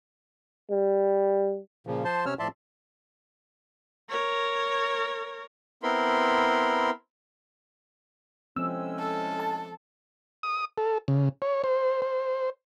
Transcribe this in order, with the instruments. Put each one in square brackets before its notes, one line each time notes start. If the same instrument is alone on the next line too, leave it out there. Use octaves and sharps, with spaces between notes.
[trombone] G3
[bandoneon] A#2 C#3 F3
F3 C5 A5 C6
C3 C#4 C#5 E6 F6
A2 F3 D5 E5 A5 C6
[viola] A#4 C#5
[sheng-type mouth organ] B3 C4 E4 A#4 B5 C6
[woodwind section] A2 G#3 C#4 [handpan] F3 C4 [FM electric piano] E6
[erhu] A4
[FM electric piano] A5
[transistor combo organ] D#6
A4
C#3
C#5
C5
C5